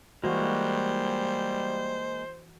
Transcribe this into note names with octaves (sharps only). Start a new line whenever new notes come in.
E3 G3 G#3 A#3 F#4 C5